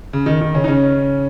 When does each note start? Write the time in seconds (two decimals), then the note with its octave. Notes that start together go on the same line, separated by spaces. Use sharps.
0.13 C#3
0.26 D#3
0.41 D#3
0.54 C#3 C#4
0.64 D#4
0.68 C#3 C#4